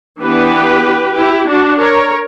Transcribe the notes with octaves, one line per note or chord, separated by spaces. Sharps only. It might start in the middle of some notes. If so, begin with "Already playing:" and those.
E3 B3 D4 G4 B4
E4 G4
D4 F#4
A#4 C#5